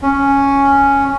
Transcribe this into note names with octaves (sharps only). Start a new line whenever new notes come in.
C#4